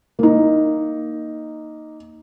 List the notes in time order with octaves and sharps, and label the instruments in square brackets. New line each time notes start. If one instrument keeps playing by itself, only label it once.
[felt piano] A#3 D#4